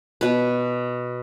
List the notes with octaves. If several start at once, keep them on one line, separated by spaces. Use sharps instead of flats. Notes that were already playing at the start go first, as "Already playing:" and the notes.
B2 B4